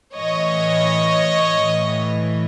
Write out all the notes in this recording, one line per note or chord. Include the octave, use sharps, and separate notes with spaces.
A2 E3 C#5 D#5
A2 E3